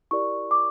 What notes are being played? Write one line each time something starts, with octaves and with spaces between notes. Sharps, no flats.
E4 G4 A#4 D5 C#6
D6